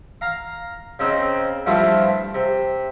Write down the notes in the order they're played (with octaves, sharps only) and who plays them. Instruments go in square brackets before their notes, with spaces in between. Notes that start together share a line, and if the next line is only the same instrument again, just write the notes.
[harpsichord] F5 A#5
C#3 C4 D#4
G2 E3 F3 A3 F4
C3